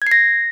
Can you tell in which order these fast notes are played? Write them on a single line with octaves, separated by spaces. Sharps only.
G#6 C7 A#6